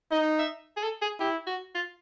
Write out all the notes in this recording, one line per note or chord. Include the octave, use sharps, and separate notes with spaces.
D#4 D#5
E5
G#4
A4
G#4
E4 G4
F#4
F4